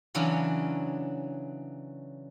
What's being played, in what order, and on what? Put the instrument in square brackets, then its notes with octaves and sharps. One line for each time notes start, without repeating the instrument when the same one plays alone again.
[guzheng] C#3 E3 F#3 C#4 D4